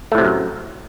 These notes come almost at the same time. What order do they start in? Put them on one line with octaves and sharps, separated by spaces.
A3 A2 C3 F#3 F#2